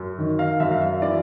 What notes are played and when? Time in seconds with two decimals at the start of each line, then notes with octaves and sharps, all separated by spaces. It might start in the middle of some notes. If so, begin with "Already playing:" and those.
Already playing: F#2
0.19 D#3
0.39 F5
0.60 F#2 E5
0.71 F5
0.81 E5
1.02 E3 D5